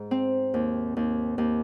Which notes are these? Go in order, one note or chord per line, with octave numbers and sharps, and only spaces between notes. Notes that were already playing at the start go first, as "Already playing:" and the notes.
Already playing: G#2 G#3
C4
D#2
D#2
D#2